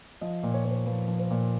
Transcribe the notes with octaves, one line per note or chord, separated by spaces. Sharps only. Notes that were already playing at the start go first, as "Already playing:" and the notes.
F3 D#5
A#2
C#5
A#2 C#5
C5
F3 B4
F3
C5
A#2